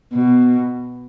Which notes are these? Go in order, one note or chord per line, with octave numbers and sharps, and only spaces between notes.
B2